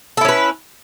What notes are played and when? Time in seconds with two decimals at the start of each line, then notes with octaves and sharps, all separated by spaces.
0.17 A4
0.21 E4
0.25 C#4
0.29 B4